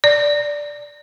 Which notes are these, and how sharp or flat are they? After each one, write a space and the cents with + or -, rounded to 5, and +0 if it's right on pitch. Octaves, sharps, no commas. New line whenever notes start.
D5 +0